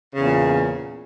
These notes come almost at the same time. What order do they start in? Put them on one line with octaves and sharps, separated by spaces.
C#3 E2 A#2